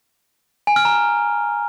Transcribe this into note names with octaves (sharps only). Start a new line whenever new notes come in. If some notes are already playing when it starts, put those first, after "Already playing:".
G#5
F6
A#5